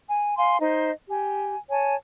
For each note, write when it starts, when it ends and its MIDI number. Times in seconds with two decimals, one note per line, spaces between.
0.07 0.35 80
0.36 0.57 77
0.36 0.57 80
0.36 0.57 84
0.60 0.91 63
0.60 0.91 72
0.60 0.91 75
1.08 1.57 67
1.08 1.57 80
1.69 1.95 73
1.69 1.95 80
1.69 1.95 81